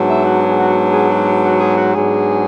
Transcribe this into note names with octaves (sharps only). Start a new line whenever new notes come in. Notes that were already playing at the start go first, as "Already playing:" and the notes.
Already playing: G#2 F#3 B3 D4
E5
F#4
G#4
F#4
G#4
F#4
F#4
G#4
F#4
G#2 F#3 B3 D4 G#4